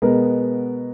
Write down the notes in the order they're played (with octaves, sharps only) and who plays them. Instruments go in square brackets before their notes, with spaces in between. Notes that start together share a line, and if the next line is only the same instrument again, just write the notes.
[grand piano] B2 G#3 B3 A#4